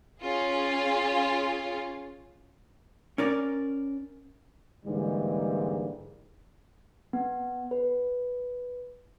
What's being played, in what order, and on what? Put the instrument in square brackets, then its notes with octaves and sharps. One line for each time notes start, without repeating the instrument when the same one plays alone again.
[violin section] C#4 F4 G#4
[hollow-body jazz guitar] C#4 A#4 D5
[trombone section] G#2 D3 E3 G3 G#3 A#3
[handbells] B3
B4